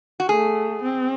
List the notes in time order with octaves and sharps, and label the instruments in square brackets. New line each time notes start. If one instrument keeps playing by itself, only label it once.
[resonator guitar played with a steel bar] F#4
[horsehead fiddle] A3 [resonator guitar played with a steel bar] G#4
[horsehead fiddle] C4